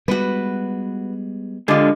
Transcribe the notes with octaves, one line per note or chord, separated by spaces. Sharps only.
G3 G#3 B3 F#4 B4
D3 G#3 F4 G4 D#5